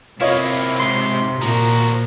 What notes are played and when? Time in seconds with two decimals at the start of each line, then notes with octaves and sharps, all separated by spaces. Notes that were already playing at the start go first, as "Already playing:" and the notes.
0.21 C3 A#3 E4 F4 C#5 D#5
0.80 G#2 C6
1.42 A#2 F3 F#4 A#5